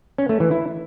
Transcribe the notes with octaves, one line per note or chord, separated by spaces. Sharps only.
C#4
A3
E3
E4